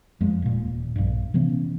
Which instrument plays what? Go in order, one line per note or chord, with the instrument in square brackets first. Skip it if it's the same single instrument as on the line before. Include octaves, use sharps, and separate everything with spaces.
[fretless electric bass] F2 G#3
D#1 A#2
A#1 G2
C3 E3 B3 C#4